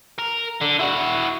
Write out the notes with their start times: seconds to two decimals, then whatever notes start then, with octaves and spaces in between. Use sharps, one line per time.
0.19 A#4
0.62 D3
0.79 E4 F#4